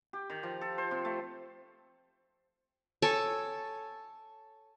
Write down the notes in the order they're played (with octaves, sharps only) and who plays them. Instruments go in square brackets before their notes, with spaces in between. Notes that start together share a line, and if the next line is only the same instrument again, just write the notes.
[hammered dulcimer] G4
D#3
F3
A4
C5
C3
A3
[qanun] A4 C#5 G#5 A5